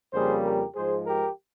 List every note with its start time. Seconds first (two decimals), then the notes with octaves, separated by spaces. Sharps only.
0.13 F2 C#3 G3 A#3 G#4 C5
0.44 G4 A#4
0.76 G#2 F3 G#3 G#4 C5
1.06 G4 A#4